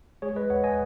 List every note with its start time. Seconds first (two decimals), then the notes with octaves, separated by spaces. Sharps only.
0.22 G#3 G#4 C#5
0.36 B4 D#5
0.50 D#2 C#5 F#5
0.64 D#5 G#5